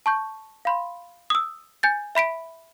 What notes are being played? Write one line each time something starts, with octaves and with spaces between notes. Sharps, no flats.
A5 C#6 G6
F5 B5 C6
D#6 E6
G#5 G6 A6
E5 B5 B6 D7